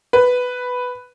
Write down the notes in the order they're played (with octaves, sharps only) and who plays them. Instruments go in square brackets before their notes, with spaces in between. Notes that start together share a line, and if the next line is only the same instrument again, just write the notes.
[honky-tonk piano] B4